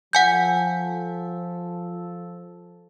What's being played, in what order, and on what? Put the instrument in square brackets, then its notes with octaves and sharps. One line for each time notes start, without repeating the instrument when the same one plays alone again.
[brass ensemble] F3 A4 [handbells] F#5 G#5 G6